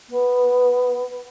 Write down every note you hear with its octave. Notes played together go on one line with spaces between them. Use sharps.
B3